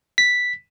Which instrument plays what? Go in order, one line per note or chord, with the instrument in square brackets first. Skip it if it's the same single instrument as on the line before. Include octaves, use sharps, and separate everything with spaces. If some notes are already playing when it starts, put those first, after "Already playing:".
[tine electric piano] B6